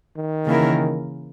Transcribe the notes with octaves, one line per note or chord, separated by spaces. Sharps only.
D#3
C#3 E3 A#3 E4 A#4